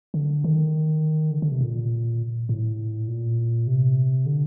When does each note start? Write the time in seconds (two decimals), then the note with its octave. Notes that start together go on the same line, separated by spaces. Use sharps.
0.14 D3
0.44 D#3
1.31 D3
1.42 D3
1.52 C3
1.61 A#2
2.49 A2
3.08 A#2
3.67 C3
4.26 D3